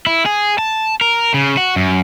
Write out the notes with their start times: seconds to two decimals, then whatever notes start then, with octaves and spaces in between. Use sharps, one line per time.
0.06 E4
0.26 G#4
0.59 A5
1.01 A#4
1.34 C#3
1.57 F#4
1.76 F#2